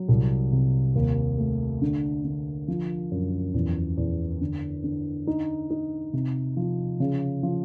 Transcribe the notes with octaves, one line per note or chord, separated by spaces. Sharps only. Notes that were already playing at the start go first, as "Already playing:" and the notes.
Already playing: F#3
C2
C3
D#2
A3
D3
D3
F3
F#2
E2
E2
D3
D3
D#4
D#4
C3
F3
C#3
F3